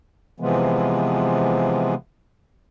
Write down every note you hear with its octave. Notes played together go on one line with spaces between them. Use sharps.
C3 E3 F3 G#3 B3